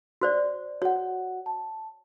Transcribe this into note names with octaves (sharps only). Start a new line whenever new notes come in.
F#4 C5 D5
F#4 C#5 F#5
A5